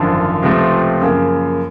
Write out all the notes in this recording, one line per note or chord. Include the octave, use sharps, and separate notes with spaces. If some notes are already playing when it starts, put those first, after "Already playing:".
Already playing: G#1 F#2 D3 F3
C#2 C3 F3 A3 C4
F#2 C#3 F3 A#3